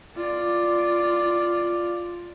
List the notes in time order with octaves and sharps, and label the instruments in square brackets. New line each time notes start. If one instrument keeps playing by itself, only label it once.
[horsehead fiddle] F4 D5